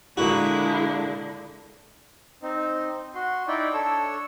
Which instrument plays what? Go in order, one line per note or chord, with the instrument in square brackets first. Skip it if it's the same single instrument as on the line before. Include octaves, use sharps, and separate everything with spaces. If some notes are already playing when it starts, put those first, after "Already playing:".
[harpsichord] A#2 F#4 [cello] D3 [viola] G#3 E4
[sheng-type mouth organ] C4 D#4
F#4 C6
D#4 E4 D5 G5
D4 A4 C#5 E6